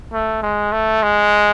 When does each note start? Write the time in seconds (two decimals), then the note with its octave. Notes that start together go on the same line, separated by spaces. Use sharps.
0.13 A3
0.43 G#3
0.72 A3
1.03 G#3